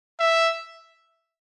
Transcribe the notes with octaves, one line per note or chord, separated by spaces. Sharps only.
E5